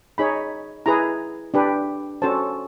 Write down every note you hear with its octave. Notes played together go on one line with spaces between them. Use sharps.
D#4 G#4 C#5 B5
E4 G#4 B4 A#5
D4 G4 B4
C#4 F#4 A4 C5 A5